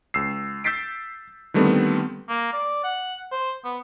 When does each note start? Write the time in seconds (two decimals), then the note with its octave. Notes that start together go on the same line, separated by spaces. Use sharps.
0.14 C#2 E6 C7
0.64 E6 G6 A6 B6 C7 D7
1.54 D3 D#3 G3 A3 B3 C4
2.29 A#3
2.53 D5
2.84 F#5
3.32 C5
3.65 B3